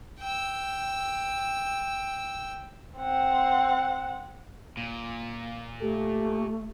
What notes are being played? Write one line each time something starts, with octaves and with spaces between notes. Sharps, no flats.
G5 E6
C4 F#5
A#2
A3 G4 A4